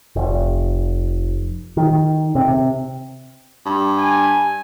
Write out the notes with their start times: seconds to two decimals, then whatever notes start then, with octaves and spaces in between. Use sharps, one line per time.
0.16 F1
1.77 D#3
2.35 C3
3.66 G2
3.96 G#5